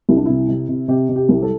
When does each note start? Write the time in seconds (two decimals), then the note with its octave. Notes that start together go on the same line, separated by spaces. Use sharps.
0.09 C2 E4
0.17 D4
0.26 C3 E4
0.48 C3
0.69 C3
0.88 C3 G4
1.09 C3
1.16 G4
1.29 C2
1.42 A4